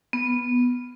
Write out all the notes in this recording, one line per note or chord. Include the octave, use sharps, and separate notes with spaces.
B3